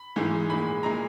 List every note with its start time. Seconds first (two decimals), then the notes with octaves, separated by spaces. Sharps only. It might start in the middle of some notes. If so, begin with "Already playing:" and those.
Already playing: B5
0.16 G#2 E3 G#3
0.50 A#2 G#3 B5
0.83 A#2 G#3 A#5